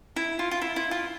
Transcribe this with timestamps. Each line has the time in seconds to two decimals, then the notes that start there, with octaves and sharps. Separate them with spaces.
0.16 E4
0.39 F4
0.51 F4
0.62 E4
0.76 E4
0.91 F4